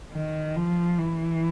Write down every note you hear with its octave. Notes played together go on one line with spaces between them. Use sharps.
D#3
F3
E3